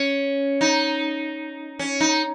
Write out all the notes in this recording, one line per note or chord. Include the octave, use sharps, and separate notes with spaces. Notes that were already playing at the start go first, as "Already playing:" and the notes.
Already playing: C#4
D#4
C#4
D#4